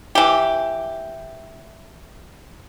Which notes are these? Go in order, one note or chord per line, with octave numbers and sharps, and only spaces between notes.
E3 G4